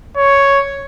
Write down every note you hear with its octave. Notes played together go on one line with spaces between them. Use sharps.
C#5